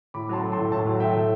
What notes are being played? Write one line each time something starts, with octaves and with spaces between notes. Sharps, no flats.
A2 B5 D6
F#3 A5 C6
A3
A2 A5 C6
A2 A5 C6
F#3
A3 E5 G5
A2